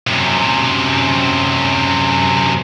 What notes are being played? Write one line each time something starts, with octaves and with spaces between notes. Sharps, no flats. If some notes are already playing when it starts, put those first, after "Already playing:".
F#2 C3